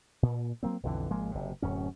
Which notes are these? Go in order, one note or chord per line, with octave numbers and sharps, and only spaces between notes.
A#2
F#3 A#3 C4
B1 F2 D3 E3
G#1 F3 G#3 A#3
F#1 C3
D1 F#2 C#4